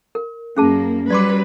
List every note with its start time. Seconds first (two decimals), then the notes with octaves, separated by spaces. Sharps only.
0.15 A#4
0.57 F#2 A#3 C#4 G#4 A5
1.10 F#3 G3 B4 D5 C6 D6